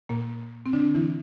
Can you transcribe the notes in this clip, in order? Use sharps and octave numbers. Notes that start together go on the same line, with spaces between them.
A#2 A#3
C4
D3 D4
E3 E4